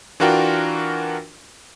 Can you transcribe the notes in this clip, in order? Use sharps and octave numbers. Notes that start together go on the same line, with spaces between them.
E3 D4 F4 F#4 A#4 G5